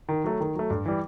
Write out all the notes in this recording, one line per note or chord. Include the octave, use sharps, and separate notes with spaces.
D#3
F#3 A3
D#3
F#3 A3
G2
E3 G3